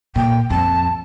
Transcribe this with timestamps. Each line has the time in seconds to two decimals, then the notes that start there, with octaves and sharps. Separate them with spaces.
0.16 A#2 G5
0.50 F2 A5